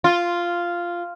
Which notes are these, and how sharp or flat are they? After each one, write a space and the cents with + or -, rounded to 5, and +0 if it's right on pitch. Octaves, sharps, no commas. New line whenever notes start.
F4 -5